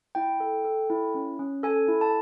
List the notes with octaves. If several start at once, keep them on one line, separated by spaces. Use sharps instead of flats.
E4 G5
A4
A4
E4
C#4
C#4
A4 G#5
E4
A5